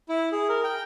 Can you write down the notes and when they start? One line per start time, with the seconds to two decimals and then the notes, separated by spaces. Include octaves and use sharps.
0.09 E4
0.32 G#4
0.49 A#4
0.64 G5